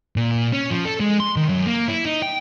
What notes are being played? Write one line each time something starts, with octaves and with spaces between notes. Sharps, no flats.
A#2
C#4
F3
A4
G#3
C6
D#3
F#2
A#3
E4
D#4
G5